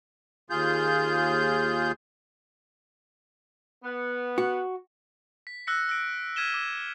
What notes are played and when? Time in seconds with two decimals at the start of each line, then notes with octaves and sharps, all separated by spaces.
0.50 D#2 F4 G#4 G6
3.84 B3
4.38 F#4
5.47 B6
5.67 E6 F#6 A#6 C#7
5.89 E6 A#6 D7
6.36 F6 G#6 B6 D#7 E7 G7
6.54 D6